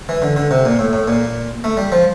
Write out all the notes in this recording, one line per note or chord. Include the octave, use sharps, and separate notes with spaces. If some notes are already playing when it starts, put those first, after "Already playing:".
E3
D3
D3
C3
A#2
A2
A2
A#2
A3
G3
F3